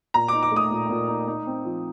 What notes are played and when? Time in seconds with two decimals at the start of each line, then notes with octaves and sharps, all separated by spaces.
0.14 A#2 A#5
0.28 D#4 D6
0.43 D6
0.52 A3 D#6
0.71 A#2
0.90 A#2
1.08 D#4
1.28 D#4
1.47 C4
1.65 F3